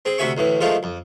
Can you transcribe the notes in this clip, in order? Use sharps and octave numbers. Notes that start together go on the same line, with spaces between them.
C4 G#4
D2 C3 F#4 E5 G#5 C#6
D2 A2 E3
D#3 F3 G#3 A3 D#4 F4
F2